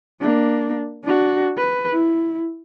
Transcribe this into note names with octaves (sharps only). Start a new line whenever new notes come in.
A#3 D4
D4 F#4
B4
E4